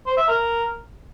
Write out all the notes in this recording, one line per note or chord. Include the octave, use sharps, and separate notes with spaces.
C5
E5
A#4